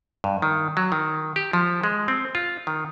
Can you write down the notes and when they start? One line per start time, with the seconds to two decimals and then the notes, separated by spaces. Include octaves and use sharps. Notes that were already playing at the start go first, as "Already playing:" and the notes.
0.24 G2
0.42 D#3
0.77 F#3
0.92 D#3
1.36 G4
1.53 F3
1.83 G#3
2.08 C4
2.35 F4
2.67 D#3